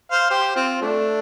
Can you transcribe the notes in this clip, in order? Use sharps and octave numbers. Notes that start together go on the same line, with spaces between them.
C5 F5
G4 C5
C4 F4
A3 D4